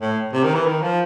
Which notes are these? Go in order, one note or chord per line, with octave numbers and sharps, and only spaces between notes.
A2
C3
D#3
E3
D#3
F3